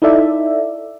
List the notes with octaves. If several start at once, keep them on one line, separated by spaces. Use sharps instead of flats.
D#4 E4 A4 D5 E5